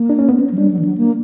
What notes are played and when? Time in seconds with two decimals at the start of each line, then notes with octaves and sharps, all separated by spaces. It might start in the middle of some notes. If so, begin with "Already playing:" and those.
Already playing: A#3
0.10 D4
0.19 C#4
0.29 B3
0.39 C#4
0.52 F#3
0.58 G3 D4
0.71 F#3
0.79 E3
0.85 F#3
0.98 A#3